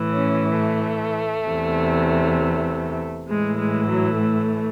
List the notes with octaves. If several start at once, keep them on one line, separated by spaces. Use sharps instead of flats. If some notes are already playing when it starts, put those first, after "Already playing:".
Already playing: A2 E3
C#4
A3
E2 C3 E3
A2 E3 G#3
G#3
F#3
A3